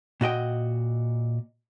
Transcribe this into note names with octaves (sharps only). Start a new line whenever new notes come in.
A#2 F#4 D#5 G5